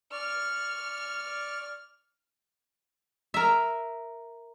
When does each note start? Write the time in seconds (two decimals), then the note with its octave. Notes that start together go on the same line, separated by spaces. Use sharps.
0.12 D5 C#6 F6
3.34 A#4 E5